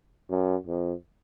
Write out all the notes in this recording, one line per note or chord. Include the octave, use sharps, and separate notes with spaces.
F#2
F2